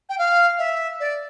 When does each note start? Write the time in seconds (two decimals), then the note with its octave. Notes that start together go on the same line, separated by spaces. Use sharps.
0.09 G5
0.18 F5
0.58 E5
1.00 D5